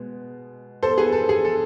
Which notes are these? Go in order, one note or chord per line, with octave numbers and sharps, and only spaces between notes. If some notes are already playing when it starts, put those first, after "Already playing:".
Already playing: B2 G#3 B3
A4 C5
G#4 B4
A4
G#4
A4